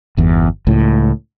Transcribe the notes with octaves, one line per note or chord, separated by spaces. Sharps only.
G1 E2
C#2 A2